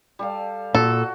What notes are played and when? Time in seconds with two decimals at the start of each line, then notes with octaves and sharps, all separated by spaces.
0.19 G3 A4 F5
0.75 A#2 F#4 A4